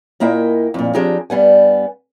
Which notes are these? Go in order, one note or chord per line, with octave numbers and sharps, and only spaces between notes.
A#2 A#3 E4 D#5 G5
F2 A#2
F3 C4 D4 G4 G#4 A#5
G2 G3 B3 G#5